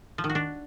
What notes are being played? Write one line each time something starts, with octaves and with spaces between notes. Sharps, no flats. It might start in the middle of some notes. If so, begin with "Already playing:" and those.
F3
D#3
F#4
D4